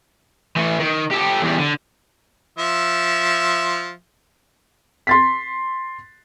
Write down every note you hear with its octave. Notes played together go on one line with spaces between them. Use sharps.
E3 A3
D#3
G4 A4
E2 G3
D3
F3 E5
C6 A6 B6